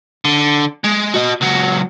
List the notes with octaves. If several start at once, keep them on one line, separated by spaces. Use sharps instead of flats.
D3
G#3
F#4 D#5
C#2 F#3